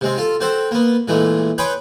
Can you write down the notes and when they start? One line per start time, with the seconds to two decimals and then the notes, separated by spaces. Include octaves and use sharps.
0.01 C3 G#3 C4
0.18 F4 A4
0.40 C4 F#4 A4 C5
0.71 A#3 B3
1.08 A#2 E3 G#3 A3
1.58 B4 C#5 G5 G#5 C6 D#6